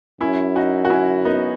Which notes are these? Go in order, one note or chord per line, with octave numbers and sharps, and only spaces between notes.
F#2 C#4 E4
D#4 F#4
F#4
C#4 E4
B3 D#4